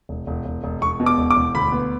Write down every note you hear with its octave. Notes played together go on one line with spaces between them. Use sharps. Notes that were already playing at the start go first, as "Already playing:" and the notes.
E1
E1
E1
E1
E1 C#6
B2
D6
E1
D6
E1
D2 B5
B3